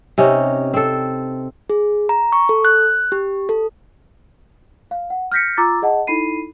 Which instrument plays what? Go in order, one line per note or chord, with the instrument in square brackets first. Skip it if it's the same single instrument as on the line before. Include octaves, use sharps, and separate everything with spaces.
[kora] C3 C#4 D#4
C4 A4
[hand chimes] G#4
A#5
C#6
A4
F#6
G4
A4
[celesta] F5
F#5
F6 G6 A#6 B6 C#7
F4 A#5 D6 E6 A6
G#4 D#5 F#5 A5
D#4 E4 A4 B5 C7 D#7